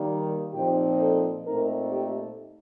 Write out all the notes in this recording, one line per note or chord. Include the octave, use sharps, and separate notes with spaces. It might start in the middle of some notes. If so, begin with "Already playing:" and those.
Already playing: D#3 G3 A#3
A#2 F3 C4 D#4 G4
A4
A#2 A3 C4 D#4 A#4
G4